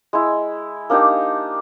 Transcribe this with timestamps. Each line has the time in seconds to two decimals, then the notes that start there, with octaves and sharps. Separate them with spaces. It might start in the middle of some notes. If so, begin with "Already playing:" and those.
0.13 G#3 E4
0.90 A#3 D4 D#4 G4